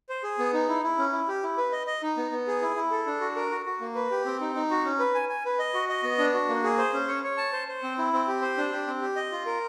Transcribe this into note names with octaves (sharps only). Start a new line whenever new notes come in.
C5
G#4
B3
D#4
E4
E4
C#4
E4
G4
E4
B4
D#5
D#5
D#4
B3
B3
G#4
E4
E4
A4
D4
F#4
A#4
F#4
F#4
A#3
B4
G4
C4
D#4
D#4
F#4
C#4
B4
G#5
G#5
B4
D#5
F#4
D#5
B3
D4
F#4
A#3
G#4
C5
C#4
C#5
C#5
A5
C5
C5
C4
E4
C4
G4
C5
D4
G4
C4
G4
D#5
F4
A#4